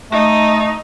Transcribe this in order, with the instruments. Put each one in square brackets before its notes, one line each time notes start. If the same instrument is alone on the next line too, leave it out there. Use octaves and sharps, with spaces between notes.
[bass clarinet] A3 [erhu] D#4